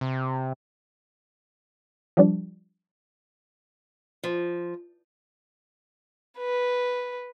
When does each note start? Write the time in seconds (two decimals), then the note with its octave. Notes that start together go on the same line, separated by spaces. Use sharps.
0.01 C3
2.17 F3 G3 D4
4.24 F3
6.38 B4